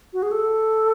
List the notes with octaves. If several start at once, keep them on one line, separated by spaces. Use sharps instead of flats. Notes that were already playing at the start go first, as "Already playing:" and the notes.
F#4
G#4
A4